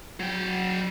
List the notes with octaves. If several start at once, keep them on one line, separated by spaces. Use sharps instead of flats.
F#3 G5